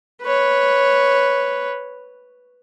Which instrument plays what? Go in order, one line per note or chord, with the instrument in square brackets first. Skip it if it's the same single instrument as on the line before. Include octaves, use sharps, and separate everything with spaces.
[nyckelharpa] B4 C#5